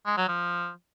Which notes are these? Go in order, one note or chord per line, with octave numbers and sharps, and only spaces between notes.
G#3
F#3
F3